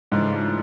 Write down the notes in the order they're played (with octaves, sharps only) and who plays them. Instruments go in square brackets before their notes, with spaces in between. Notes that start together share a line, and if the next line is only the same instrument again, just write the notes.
[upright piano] G#2 [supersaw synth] C#3 E3 A3 D4 F4